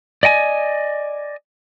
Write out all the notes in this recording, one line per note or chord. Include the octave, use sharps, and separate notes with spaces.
D5 D#5 G5 G#5